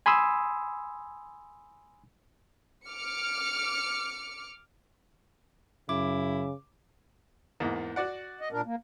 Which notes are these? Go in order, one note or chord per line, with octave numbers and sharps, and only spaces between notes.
G#5 B5 C6 D#6 E6
D6 F6 C#7
F#2 C#3 E4 D6
E2 G#2 A#3
F#4 D5 F#5
D#5
A#2 D4 A#4
A#3